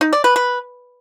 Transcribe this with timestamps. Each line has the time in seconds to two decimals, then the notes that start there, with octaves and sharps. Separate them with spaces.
0.01 D#4
0.13 D5
0.24 B4
0.36 B4